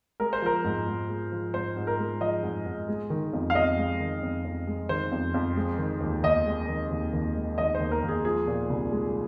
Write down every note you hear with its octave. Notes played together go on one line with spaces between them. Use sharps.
G#3 A#4
C5
F3 A#4
G#2
G#2
G#3
F3
G#2 C5
G#2
A#4
G#3
F3 D#5
G#2
G#2
G#3
D#3
F2
F5
F2 D#5
G#3
D#3
F2
F2
G#3
D#3 C5
F2
F2
G#3
D#3
D#2
D#2 D#5
G#3
D#3
D#2
D#2
G#3
D#3 D#5
C5
D#2
A#4
D#2
G#4
F3 G#4
A#2
C2
G#3